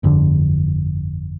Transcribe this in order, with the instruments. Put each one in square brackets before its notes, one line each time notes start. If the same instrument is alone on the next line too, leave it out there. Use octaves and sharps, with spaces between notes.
[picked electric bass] G1 F2 D3 D4